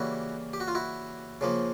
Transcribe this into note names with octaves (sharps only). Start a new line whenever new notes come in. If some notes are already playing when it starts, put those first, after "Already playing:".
Already playing: C#3 E3 G3 A#3 E4 F#4
G4
F#4
F4
E4 F#4
C#3 F3 A#3